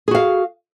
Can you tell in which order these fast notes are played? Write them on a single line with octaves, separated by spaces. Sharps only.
G#4 F#4 F5